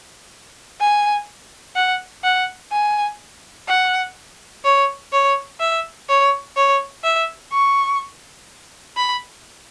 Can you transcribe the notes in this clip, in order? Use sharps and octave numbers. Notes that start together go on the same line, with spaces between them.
G#5
F#5
F#5
G#5
F#5
C#5
C#5
E5
C#5
C#5
E5
C#6
B5